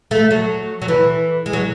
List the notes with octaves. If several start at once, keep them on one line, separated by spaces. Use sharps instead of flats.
A3
F#3
F#3
E3
G#3
F#3